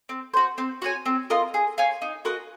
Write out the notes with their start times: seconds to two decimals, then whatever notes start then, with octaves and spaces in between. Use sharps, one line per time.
0.09 C4
0.34 F#4 C5
0.58 C4
0.82 F#4 C#5 G#5
1.06 C4
1.30 F4 A#4 D#5
1.54 G#4
1.78 C#5 F5 G#5
2.02 D#4
2.25 F#4 A#4 D#5